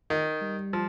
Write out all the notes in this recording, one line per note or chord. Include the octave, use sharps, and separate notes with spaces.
D#3
G3
F3